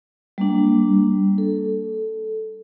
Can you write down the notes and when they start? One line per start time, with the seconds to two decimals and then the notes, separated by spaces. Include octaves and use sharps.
0.38 G3 A#3 D4
1.38 A4